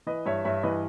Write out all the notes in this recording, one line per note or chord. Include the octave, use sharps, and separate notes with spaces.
E3 B4 D#5
G2 C#5 E5
G2 C#5 E5
E3 B4 D#5